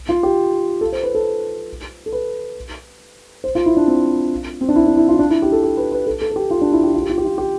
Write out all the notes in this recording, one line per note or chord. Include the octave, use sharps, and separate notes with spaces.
F4
G4
A4
C5
B4
A4
A4
B4
C5
F4
E4
D4
C4
C4
D4
E4
D4
E4
F4
E4
D4
E4
G4
A4
G4
B4
B4
A4
A4
A4
G4
F4
D4
E4
G4
F4
G4
F4
G4
F4
G4